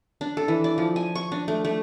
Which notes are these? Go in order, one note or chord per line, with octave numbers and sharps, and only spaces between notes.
D4
A4
E3
D5
F3
G#5
C#6
D4
A3
A3